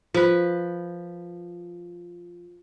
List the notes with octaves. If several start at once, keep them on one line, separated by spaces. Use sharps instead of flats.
F3 B4